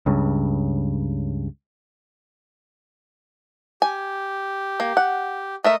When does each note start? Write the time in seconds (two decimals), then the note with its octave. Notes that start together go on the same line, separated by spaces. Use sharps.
0.06 C#2 G2 C#3
3.82 G4 G#5
4.80 A#3
4.97 F#5
5.64 A3 A#4 D#5 E5